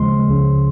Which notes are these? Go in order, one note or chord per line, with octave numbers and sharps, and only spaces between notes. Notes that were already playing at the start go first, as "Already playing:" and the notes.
Already playing: D#2 C#3 F3 G#3 C6
C#2 C#3 F3